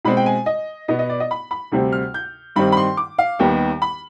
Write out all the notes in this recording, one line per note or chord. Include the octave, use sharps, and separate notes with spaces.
B2 G#3 C4 B5
G5
G#5
D#5
B2 B3 D#5
D#5
D5
D#5
B5
B5
D2 C3 G3 C4
F6
G6
G2 D#3 G3 C4 B5
B5
C6
D6
F5
D#2 D#3 G3 B3 G5
B5